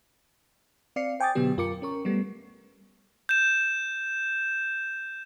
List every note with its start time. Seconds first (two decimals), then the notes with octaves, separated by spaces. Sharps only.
0.96 C4 D5 F5 C7 C#7
1.20 C5 G5 G#5 D6 D#6 A6
1.35 B2 D3 F#3 B3 G4
1.57 F#2 F4 A#4 D6 C#7
1.82 C#4 A#4 C#6
2.05 G3 A3 B3
3.29 G6 E7